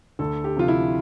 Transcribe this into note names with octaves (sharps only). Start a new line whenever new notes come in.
D2 A4
G4
C3 F3 F4
E4